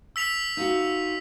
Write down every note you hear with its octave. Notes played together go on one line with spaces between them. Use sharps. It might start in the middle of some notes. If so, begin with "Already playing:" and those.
E6 B6 F7
D#4 F4 F#4